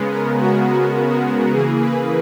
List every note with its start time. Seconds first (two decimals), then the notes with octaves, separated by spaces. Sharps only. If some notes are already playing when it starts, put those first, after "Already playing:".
Already playing: C#3 G#3 B3
0.11 A#4
0.39 F#4
0.68 F#4
1.09 F#4
1.53 C#3 E3 A#3 G#4
1.81 B4